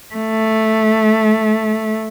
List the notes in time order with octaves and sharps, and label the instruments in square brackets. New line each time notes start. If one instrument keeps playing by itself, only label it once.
[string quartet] A3